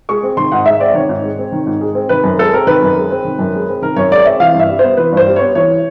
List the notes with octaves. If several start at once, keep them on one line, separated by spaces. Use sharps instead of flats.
G#3 C#6
C4
D#3 C6
G#2 F#5
G#3 E5
C4 D5
D#3 C#5
G#2
G#3
C4
D#3
G#2
G#3
C4
D#3 B4
F#2
G#3 A4
C4 A#4
D#3 B4
F#2
G#3
C4
D#3
F#2
G#3
C4
D#3 A#4
F#2 C#5
G#3 D5
C4 E5
E3 F5
G2 E5
G3
B3 C5
E3 B4
G2
C5
G3
B3 C#5
E3 C#5